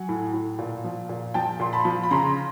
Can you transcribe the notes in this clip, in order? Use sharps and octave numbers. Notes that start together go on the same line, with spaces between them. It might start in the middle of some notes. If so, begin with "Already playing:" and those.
Already playing: F#3 F#5 G#5
A2
A2
A#2
F3
A#2
F3 G5 A5
A#2 C6
A5 B5
F3
B5
C#3 A#5 C6